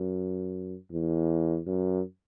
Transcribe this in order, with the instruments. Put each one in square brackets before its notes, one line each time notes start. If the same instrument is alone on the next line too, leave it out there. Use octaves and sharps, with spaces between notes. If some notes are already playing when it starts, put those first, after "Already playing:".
Already playing: [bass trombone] F#2
E2
F#2